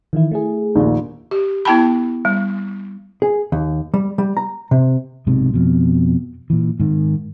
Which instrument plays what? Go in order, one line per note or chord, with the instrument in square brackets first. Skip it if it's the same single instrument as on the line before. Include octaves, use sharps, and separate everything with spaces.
[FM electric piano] D#3 E3 E4
A3 E4 G#4
[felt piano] A#1 D#2
[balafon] G4
B3 E4 G5 A5 B5
G3
[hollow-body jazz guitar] G#4
D#2
G3
G3
A#5
C3
[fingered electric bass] B1 G#2 C3
F2 B2
A#2 E3
G#2 D#3